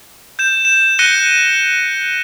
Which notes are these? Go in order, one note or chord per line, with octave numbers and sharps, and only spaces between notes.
G6 E7
E7
F#6 A#6 C#7 D#7 G7